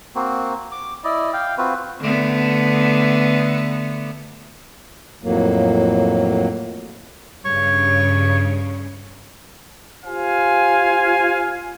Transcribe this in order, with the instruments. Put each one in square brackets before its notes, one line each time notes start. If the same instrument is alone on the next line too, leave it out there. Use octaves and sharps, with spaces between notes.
[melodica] A#3 C4 F#4
D6
E4 D5 D#5
F5 G5
C4 F4 F#4 B4
[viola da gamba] D3 A3 B3
[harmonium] F2 A2 F#3 A#3
[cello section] G2 C#3 [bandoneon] C#5 C#6
[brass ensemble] F4 G4 C5 F5 G#5